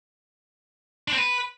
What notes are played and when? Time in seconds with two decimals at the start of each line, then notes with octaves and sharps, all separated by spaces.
1.08 D4
1.13 C4
1.18 B4